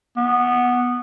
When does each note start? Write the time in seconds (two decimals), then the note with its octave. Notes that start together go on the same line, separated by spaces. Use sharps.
0.17 B3